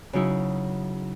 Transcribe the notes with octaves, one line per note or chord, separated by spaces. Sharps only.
C#3 F#3 D#4 E4